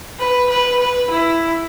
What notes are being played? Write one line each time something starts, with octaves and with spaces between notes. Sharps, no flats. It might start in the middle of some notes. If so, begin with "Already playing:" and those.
B4
B4
B4
E4